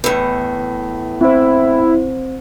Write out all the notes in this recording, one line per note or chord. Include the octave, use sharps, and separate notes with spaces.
E2 A2 B4
C4 E4 C5